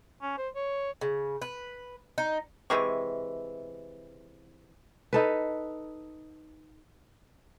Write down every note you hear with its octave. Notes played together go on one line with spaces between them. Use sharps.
C#4
C5
C#5
C#3
B4
D#4
C3 E3 G#3 C#6
D#4 A4 B4